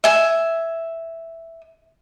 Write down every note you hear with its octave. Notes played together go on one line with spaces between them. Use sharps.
E5 G#5